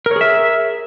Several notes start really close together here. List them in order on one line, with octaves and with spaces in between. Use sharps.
A#4 C#5 G#4 E5